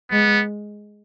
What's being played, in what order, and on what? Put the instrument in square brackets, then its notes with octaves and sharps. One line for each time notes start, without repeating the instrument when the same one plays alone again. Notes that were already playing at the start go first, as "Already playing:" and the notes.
[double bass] G#3 [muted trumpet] B3